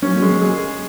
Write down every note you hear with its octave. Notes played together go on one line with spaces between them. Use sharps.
F#3 A#3 C#4
F#3 A#3
G#3
F#3 A#3
G#4